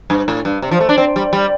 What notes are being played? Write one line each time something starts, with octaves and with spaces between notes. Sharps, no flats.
G2
A2
G2
C3
F3
A3
D4
C4
G3
G3